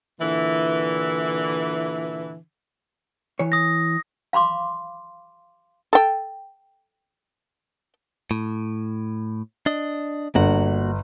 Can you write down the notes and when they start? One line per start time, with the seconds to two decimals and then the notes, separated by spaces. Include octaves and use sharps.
0.20 A#2 D3 E3
3.39 E3 C#5
3.52 D#6 A#6
4.33 F5 B5 C6 D6
5.93 A4 G5
8.31 A2
9.66 D4 D#5
10.35 G1 A#3 F#4 F#5